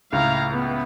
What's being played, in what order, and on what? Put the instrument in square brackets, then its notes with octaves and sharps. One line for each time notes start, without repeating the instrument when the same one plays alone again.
[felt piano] C#2 A2 [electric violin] F5 A#5
[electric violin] B3